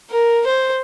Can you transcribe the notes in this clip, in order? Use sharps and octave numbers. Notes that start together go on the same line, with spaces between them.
A#4
C5